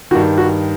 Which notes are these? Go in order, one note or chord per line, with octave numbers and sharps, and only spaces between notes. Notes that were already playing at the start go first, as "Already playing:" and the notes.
G2 D#3 F#4
F#4